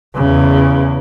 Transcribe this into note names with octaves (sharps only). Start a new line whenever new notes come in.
E2 C#3